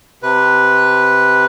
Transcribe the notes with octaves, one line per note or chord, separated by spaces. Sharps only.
C3 B4